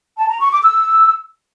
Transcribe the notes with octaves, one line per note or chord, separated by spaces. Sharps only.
A5
A#5
C#6
D6
E6